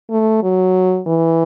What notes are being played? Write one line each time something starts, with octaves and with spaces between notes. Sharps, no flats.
A3
F#3
E3